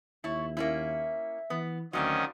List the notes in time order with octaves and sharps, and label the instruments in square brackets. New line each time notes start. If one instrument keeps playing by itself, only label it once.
[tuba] D#2 [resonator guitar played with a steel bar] E4 [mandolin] C#5 A5
[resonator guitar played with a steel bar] A#3 C#4 E4 [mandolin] E5
[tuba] E3 [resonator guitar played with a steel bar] B3
[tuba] D2 [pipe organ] D#3 C#4 D#5 [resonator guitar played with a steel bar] F#3 C4 [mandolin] F4 D5